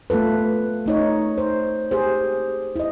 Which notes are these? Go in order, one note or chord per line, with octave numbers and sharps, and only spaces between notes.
A3 B3 F4 A4 B4
A3 D#4 C#5
C5
G4 G#4 C5
E4 D#5